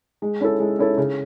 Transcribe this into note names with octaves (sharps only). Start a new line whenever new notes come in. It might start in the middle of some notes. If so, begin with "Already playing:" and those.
G#3
C#4 E4 A4
G#3
C#4 E4 A4
C#3